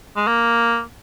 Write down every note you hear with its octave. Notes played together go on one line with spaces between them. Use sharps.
G#3
A#3